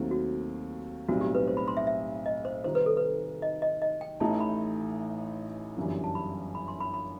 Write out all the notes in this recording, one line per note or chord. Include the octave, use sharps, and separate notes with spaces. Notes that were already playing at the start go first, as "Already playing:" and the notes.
Already playing: D#2 D#3 F#3 A3 C4
F#4
B1 A2 G3 C4 F#4
G4
B4
C5
B5
C6
E5
E5
D#5
C5
C3 D#3 G3 D#4 C5
B4
A4
B4
D#5
D#5
D#5
G5
A1 A2 E3 A3 D#4 A5
B5
G1 F#2 E3 G3
A5
B5
B5
C6
B5
B5